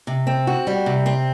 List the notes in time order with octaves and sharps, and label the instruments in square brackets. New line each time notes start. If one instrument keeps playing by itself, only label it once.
[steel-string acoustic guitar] C3
C4
F#4
G3
C3
C4